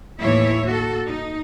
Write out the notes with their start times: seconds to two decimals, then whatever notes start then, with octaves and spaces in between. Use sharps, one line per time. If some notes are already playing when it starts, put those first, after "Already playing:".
0.21 D#2 A2 E3 E4 C#5 E5
0.65 A#3 F#4 A4
1.07 D#4